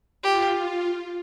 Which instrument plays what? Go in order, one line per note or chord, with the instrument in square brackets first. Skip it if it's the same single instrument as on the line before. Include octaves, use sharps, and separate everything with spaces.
[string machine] F4 [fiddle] G4